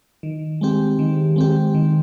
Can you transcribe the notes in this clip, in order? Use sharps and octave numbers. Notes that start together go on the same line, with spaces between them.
D#3
G#3 C4 G4
D#3
G#3 C4 G4
D#3